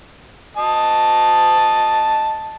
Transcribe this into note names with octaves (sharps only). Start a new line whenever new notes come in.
D#5 A5